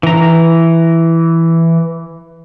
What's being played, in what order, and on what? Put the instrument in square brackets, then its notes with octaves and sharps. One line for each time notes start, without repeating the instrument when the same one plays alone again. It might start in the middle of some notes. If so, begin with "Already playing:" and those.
[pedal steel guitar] E3 A#5